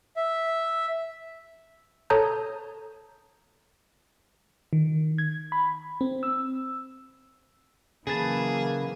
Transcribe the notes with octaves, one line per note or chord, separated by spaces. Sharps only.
E5
A4 C#5 A5 A#5 D#6 G6
D#3
G#6
B5
C4
E6
C#3 E3 F#3 A#3 G#4 B4 A5